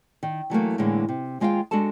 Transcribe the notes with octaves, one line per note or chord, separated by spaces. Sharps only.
D#3
E3 F#3 A3 A#3
A2 D3 E3 G#3 A#3
C3
D#2 G#3 F4 D#5 F5 G5
G#3 D4 F#4 A4 A5